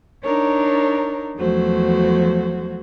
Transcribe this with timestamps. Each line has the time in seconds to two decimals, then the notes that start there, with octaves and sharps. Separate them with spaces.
0.24 D4 D#4 A#4 C#5
1.37 E2 F3 F#3 A3 F#4 C5